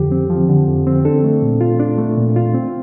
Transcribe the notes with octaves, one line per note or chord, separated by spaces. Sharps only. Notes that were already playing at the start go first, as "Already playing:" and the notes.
Already playing: F2 D3 F3 G4
C4
F3
D3
F2
C4
D4 A4
A3
A#2
F4
D4
A3
A#2
F4
C4